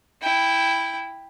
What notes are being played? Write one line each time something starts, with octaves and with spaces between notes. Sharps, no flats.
E4 G5